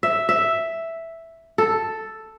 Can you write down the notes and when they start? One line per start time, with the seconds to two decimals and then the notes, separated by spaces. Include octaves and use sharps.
0.03 E5
0.29 E5
1.58 A4